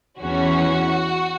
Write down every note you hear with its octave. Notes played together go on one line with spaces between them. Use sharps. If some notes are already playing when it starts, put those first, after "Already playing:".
E2 E3 C#4 F#4